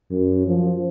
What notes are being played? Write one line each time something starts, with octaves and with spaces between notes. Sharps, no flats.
F#2
F3